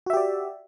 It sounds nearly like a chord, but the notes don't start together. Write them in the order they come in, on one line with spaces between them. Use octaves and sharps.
F#4 E5 G4 D5